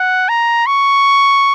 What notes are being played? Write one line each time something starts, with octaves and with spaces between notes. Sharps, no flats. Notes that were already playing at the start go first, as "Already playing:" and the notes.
Already playing: F#5
A#5
C#6